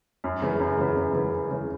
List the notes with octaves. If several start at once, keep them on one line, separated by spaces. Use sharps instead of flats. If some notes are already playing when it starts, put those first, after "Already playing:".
F#2
C#3 E3
F#2
C#3 E3
F#2
C#3 E3
F#2
C#3 E3